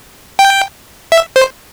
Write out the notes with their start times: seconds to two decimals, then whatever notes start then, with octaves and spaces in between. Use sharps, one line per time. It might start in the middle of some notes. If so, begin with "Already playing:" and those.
0.39 G5
1.12 E5
1.36 C5